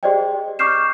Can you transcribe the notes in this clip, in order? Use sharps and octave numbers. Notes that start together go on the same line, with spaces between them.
G4 G#4 C5 D5 D#5 G5
C#6 D6 F6 G6 C7 E7